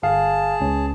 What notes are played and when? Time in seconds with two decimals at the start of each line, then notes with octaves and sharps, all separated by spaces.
0.03 G1 G#4 F5 A5
0.61 C#2 C#4